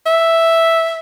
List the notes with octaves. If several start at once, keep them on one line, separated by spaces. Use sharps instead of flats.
E5